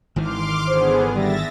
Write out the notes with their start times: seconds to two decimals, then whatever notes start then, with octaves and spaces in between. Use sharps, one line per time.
0.16 G#1 D#3 E3 C6 D6 F6
0.68 D3 B3 G#4 C5
1.14 G3 E5 A6 A#6